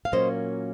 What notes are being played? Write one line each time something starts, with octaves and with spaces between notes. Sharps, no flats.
F5
A#2 F#3 A#3 C#4 C5 D#5